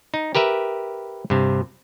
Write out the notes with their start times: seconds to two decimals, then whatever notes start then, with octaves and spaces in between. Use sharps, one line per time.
0.14 D#4
0.35 G4 A#4 B4 E5
1.30 G2 C3